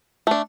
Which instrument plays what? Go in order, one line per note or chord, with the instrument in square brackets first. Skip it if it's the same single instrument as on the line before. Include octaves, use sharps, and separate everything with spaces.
[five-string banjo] A3 D4